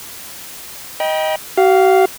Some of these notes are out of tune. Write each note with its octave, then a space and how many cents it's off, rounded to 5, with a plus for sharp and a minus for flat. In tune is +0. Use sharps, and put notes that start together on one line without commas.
D#5 +10 G5 +0 B5 -45
F#4 +45 F5 +0